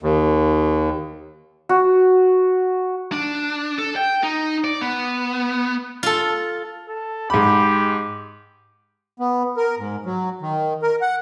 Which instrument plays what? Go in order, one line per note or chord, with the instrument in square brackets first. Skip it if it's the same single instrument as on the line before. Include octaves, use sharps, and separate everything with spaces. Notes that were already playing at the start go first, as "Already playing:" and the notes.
[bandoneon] D#2
[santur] F#4
[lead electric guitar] D4
A4
G5
D#4
D5
B3
[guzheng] F4 A4
[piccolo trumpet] A4
[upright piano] G#2 B5 [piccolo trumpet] G4
[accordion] B3
A#4
G#2
F#3
D#3
A#4
F#5